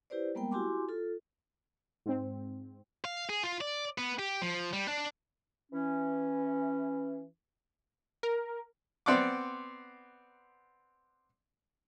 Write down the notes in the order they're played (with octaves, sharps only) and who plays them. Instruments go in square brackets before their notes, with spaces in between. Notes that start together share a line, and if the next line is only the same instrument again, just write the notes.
[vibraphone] E4 G4 B4 C5 D5
G3 G#3 A#3 B3 A#4 G5
E4 F#4 G4 G#5 C6 D6
F4 A4
[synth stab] G#2 C4
[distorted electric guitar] F5
G#4
F4
D5
B3
G4
F3
G3
D4
[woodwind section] E3 C#4
[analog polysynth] A#4
[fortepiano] B3 C4 D5 F#5 C6 D6